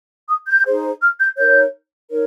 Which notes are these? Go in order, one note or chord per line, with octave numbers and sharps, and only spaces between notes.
D#6
G6
D#4 G#4 C5
F6
G6
D#4 A#4 C#5 G6
D#4 A#4 C#5